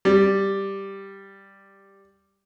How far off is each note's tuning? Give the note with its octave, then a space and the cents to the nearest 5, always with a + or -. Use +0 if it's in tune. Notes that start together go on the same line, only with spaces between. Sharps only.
G3 +0